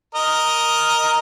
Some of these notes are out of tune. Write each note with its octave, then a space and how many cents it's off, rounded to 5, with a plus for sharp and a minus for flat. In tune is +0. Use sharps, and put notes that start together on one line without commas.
A#4 +0 D#5 +0